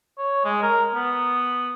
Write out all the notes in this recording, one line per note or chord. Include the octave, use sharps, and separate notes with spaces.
C#5
G#3
A#4
B3